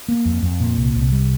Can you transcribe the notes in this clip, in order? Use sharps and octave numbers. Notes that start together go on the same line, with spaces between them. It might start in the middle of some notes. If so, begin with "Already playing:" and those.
A#3
F2
F2
A#2
C2
C2
G3